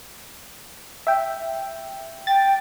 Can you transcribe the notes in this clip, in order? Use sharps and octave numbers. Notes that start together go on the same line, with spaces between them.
E5 G5
G5 A6